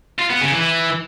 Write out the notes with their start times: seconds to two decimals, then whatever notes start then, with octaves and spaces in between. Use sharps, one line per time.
0.19 F4
0.30 B3
0.41 C#3
0.52 E3